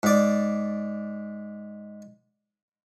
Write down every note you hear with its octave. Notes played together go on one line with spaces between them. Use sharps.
G#2 D5